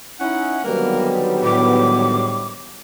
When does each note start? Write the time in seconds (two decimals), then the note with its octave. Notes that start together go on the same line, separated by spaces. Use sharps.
0.20 C#4 D#4 E4 F#5
0.65 G#2 D3 D#3 F#3 G3 A#3 B3 A#4
1.43 A2 D6